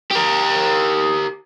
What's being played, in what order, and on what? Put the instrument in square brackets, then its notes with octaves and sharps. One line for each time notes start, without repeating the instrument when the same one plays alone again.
[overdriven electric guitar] G4 A#4